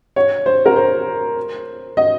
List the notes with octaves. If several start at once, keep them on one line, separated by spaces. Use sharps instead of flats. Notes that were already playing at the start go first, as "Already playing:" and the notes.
C#5
C5
A#4
C5
D#5